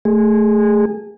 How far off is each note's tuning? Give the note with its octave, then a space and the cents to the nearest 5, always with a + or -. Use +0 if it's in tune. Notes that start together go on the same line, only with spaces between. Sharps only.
A3 +0 G#4 -20